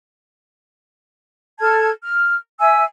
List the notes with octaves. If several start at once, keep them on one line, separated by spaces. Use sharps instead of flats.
A4 A5 F6 G#6
F6
E5 G#5 E6